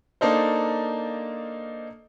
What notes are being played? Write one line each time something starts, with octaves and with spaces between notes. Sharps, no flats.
A#3 D4 D#4 A4 C5